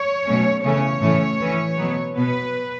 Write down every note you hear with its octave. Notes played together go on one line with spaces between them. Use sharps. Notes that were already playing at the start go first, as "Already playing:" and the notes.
Already playing: C#5
B2 F#3 A3 C#4
C#3 E3 A3 C#4 C#5
A2 E3 A3 C#4
E3 C#4
B2 F#3 B3
B2 B3 B4